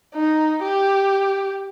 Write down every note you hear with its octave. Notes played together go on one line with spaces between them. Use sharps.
D#4
G4